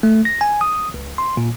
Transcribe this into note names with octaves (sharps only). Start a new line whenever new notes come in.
A3
A#6
G#5
D#6
C#2
C6
A#2